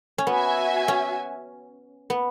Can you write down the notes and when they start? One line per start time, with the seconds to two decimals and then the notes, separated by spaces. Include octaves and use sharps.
0.18 C#4
0.27 B3 F#4 E5 G#5
0.88 C#4
2.10 B3